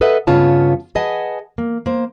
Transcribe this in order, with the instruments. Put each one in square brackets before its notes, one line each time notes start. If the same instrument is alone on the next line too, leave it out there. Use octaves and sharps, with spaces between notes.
[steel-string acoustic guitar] A4 B4 D#5 E5 F#5
G2 C#3 B3 F4 C#5 A5
G#4 B4 D#5 F#5 G#5 A5
A#3
A#3 C5